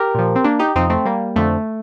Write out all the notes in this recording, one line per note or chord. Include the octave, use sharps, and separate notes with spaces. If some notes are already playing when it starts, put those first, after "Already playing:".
Already playing: G4 A#4
A#2 F3
C4
A#3 D4
D#4 G4
F2 C3 F3 C4 D#4
A3 C4
G3 A#3
F2 D3 F3 A3